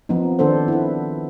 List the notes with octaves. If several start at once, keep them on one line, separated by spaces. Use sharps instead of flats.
F3 B3 C4 D#4
D#3 B3 D4 A4 C5
E4 B4